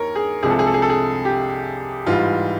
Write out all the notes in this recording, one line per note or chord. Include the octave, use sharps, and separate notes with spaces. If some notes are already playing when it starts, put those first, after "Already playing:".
Already playing: D#2 A#4 C#5
G#4
C2 C3 F3 G#3 G#4
A4
G#4
A4
G#4
A4
G#4
G4
G#2 E3 G3 F4